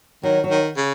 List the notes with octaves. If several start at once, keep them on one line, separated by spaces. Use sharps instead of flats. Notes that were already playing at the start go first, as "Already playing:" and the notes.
D#3 F#3
F#3
D#3
C#3